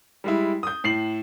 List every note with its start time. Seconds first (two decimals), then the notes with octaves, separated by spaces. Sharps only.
0.24 G3 G#3 E4
0.63 D#6 G6
0.84 A2 C7 F#7